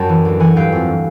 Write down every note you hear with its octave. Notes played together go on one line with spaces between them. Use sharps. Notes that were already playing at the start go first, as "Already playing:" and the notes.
Already playing: F#2 G5 A5
E3
D2
E3 F#5 G#5
G2 F5 G5
F2